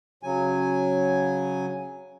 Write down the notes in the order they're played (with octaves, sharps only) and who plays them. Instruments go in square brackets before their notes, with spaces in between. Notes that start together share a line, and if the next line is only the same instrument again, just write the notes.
[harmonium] C#3 F#3 G#5